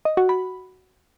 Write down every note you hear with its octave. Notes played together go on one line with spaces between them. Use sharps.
D#5
F#4
B5